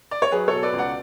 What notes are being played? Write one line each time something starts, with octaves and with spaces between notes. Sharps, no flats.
D5
C#5
F#3 G#4 B4
B2 A4 C#5
B4 D5
C#2
D5 F#5